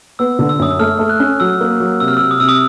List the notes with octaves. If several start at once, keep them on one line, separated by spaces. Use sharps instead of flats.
B3 E6
D3
E6
F#2 D#6
E6
A3 F6
A3
F#6
C#4
F#3 E6
A#3
F#3
C3 E6
F6
E6
C3
D#6
C3 E6
D#6